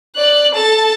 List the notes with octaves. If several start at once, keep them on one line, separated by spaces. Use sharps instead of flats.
D5 F#6
A4 A5